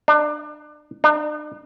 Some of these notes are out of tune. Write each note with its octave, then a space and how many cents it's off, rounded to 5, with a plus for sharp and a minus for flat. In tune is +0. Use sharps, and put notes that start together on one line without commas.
D4 +30
D4 +45